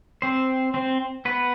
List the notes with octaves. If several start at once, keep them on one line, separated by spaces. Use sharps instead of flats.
C4 C5
C4 C5
B3 B4